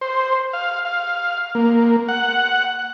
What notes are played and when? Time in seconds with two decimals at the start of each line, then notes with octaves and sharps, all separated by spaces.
0.01 C5
0.53 F5
0.85 F5
1.55 A#3
2.08 F#5